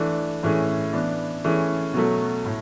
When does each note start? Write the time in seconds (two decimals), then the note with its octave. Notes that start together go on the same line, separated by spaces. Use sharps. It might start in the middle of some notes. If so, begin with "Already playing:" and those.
Already playing: E3 A3 D4
0.43 A2 E3 A3 C#4 G#4
0.93 E3 B3 D4
1.44 E3 A3 C#4 G#4
1.94 B2 F#3 A3
2.45 A2